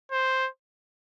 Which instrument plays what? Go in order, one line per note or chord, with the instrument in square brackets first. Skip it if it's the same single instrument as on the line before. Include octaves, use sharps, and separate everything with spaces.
[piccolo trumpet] C5